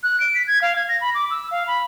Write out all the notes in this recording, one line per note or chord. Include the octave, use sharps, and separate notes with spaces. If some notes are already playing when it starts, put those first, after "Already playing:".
F#6
D7
B6
G#6
F5
G#6
A#6
B5
D6
E6
F5
B5